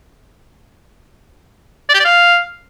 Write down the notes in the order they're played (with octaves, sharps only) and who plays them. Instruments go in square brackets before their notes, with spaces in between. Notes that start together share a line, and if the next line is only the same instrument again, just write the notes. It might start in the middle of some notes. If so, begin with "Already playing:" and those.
[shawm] D5
G4
D5
F5